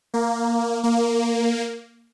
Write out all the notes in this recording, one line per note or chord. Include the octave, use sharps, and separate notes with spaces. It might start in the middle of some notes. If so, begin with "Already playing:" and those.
A#3
A#3